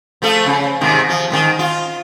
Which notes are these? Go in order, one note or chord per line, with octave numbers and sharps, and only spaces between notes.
F3 A3 A4
C#3
G#2 C3 D#3
F3
G#2 D3 D#3
F4